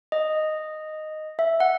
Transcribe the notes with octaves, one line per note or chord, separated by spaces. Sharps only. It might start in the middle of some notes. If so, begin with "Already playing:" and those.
D#5
E5
F#5